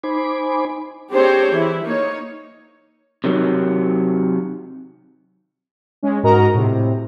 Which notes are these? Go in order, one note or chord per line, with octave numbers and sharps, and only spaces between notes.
D#4 C5 G#5 B5 D6
C4 D4 G4 G#4 C5 C#5
E3 E4
A#3 D#4 C#5
C3 D#3 F#3
G#3 C#4
G#2 F#4 A#4 D#5 A#5
A2 C3